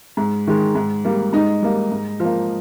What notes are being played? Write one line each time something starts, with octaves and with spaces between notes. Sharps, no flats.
G#2
D#3 G#3
G#2
G3 A#3
G#2 D#4
G3 A#3
G#2
F3 A#3